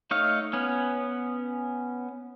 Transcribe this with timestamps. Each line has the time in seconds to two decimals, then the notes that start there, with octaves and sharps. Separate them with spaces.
0.11 A3 D#4 C#5 F5
0.53 B3 C#4